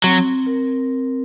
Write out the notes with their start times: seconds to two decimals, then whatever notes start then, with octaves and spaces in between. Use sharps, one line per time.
0.04 F#3 C4
0.47 A#4